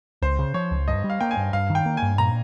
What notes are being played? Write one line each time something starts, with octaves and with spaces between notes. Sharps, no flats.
C#2 C5
C#3
F3 C#5
C#2
G2 D#5
G3
F5
A#3 G5
G#5
G2
G2 F5
D#3
G5
A#3
G2 G#5
A#2 A#5